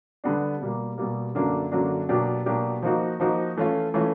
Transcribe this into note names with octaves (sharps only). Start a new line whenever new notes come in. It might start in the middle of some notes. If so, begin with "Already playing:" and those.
D3 G3 B3 D4
B2 G3 A#3
B2 G3 A#3
F#2 D3 F#3 A#3 D4
F#2 D3 F#3 A#3 D4
B2 F#3 A#3 D4 G4
B2 F#3 A#3 D4 G4
F3 A#3 D#4 F#4
F3 A#3 D#4 F#4
E3 A3 C#4 F4
E3 A3 C#4 F4